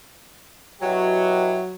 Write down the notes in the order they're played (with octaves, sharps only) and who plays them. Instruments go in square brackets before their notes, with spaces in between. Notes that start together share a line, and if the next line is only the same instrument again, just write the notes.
[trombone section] B2 E4 G4 [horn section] F#3